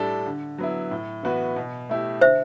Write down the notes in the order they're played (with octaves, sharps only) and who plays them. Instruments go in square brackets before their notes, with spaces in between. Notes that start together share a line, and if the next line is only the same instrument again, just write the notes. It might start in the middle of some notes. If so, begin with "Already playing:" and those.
Already playing: [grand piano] A2 G3 D4 A4
D3
F#3 B3 E4
A2
E3 B3 F#4 B4
B2
A3 E4 G4
[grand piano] D3 [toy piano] C5 E5